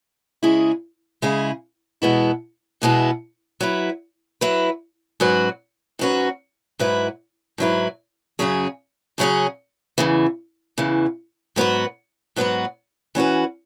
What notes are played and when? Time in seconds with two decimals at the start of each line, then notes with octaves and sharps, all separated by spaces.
0.43 C#3 G#3 E4 G#4
1.22 C#3 G#3 E4 G#4
2.02 E2 B2 G#3 B3 E4
2.82 E2 B2 G#3 B3 E4
3.61 F#3 E4 B4
4.41 F#3 E4 B4
5.20 G#2 F#3 C#4 F#4 B4
5.99 G#2 F#3 C#4 F#4 B4
6.79 G#2 F#3 E4 B4
7.58 G#2 F#3 E4 B4
8.39 F#2 C#3 F#3 C#4 G#4
9.18 F#2 C#3 F#3 C#4 G#4
9.98 E2 C#3 E3
10.78 E2 C#3 E3
11.56 G#2 F#3 B3 F#4 B4
12.36 G#2 F#3 B3 F#4 B4
13.15 E3 C#4 F#4 B4